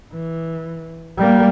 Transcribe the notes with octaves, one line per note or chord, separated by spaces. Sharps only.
E3
G3 A#3